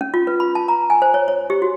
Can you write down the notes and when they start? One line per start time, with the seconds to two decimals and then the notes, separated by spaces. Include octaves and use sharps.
0.01 C#4
0.14 F4
0.27 B4
0.40 B5
0.55 A5
0.68 A#5
0.90 G#5
1.02 C5
1.14 C#5
1.28 C#5
1.50 G4
1.62 F#4